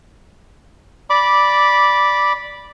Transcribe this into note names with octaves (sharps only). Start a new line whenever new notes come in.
D5 B5 D6